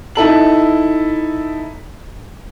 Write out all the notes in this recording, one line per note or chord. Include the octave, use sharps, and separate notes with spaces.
D#4 E4 A4 F#7